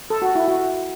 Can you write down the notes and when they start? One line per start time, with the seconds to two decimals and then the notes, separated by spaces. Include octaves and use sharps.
0.10 A4
0.22 F#4
0.35 E4
0.48 F#4